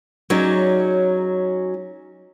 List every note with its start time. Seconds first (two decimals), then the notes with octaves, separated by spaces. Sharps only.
0.30 F#3 C#4 D#4 G#4 D5